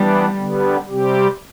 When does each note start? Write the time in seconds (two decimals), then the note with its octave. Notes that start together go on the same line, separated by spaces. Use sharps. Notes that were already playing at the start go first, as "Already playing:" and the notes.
Already playing: E3 G3 B3 D4
0.37 D3 G3 B3
0.87 C3 G3 C4 G4